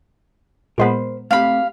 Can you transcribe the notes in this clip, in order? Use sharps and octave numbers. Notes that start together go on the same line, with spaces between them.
A#2 G#3 B3 A#4 C5 B5
A3 C4 G4 F5 B5